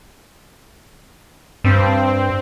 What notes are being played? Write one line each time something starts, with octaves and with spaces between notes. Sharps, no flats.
G2 C4